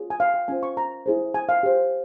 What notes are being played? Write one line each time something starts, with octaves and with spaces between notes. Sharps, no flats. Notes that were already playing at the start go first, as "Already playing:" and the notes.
Already playing: F4 G#4 C#5
G#5
F5
G5
C#4 F4 C5 G#5
C#6
A#5
E4 G#4 C5
G#5
F5
G4 C5